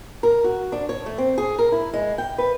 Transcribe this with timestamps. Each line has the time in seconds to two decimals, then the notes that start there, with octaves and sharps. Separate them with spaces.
0.23 A#4
0.44 F#4
0.72 D4
0.89 C#5
1.06 A3
1.18 C4
1.38 G#4
1.59 A#4
1.72 E4
1.93 G#3
2.18 G5
2.38 B4